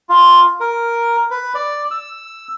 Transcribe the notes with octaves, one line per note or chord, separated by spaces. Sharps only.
F4
A#4
B4
D5
E6